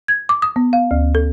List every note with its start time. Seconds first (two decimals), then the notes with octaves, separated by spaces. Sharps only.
0.08 G#6
0.29 D6
0.42 D#6
0.56 B3
0.73 F5
0.91 D2
1.15 A4